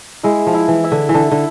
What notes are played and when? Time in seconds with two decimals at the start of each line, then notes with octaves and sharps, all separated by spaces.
0.23 G#3 E4
0.47 F3
0.54 E4
0.68 E3
0.84 E5
0.92 D3
1.09 E3
1.14 D3 A4
1.31 D3